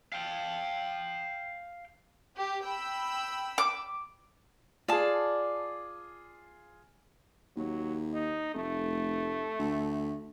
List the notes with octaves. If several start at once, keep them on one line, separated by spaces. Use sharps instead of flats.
F5 G5
G4
G5 B5 E6
D6
F4 G#4 D5 A5
D#2 F#3
D#4
F1 A3
D2